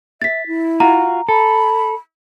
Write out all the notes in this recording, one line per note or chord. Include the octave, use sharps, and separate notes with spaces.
E5 A6 B6
E4
F4 F#4 A#5
A4 B5